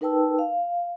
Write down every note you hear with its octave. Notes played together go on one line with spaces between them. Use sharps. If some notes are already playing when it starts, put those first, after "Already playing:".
D#4 A#4 B4 G5 A5 E6
F5